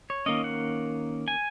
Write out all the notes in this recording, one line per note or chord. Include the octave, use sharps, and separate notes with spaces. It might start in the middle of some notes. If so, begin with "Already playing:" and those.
C#5
D#3 A#3 C#4 D#5
F#5
G#5